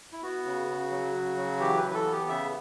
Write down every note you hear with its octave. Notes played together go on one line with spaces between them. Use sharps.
E4
B3 F#4
C#3
C#3
F#3
C#3
F#3
E3 G4
B4
E3
B4
A4
B3
G4
C#3 E5